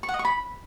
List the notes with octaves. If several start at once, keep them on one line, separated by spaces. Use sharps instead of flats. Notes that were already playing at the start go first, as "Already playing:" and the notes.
C#6
F#5
D#5
C#6
B5